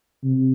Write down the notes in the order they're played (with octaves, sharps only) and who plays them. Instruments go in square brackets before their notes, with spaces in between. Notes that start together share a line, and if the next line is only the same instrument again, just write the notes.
[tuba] C3